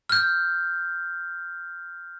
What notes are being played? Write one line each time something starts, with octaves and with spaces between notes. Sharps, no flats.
F6 G6